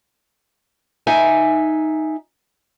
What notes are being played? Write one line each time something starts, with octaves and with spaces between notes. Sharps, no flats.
D#4 E5 G#5